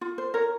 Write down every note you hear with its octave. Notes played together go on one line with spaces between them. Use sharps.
F4
C5
A#4 C#5